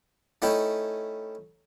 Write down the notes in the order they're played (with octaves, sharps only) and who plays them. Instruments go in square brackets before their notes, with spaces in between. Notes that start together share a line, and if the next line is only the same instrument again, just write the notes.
[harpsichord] A3 C#4 D#4 E4 G5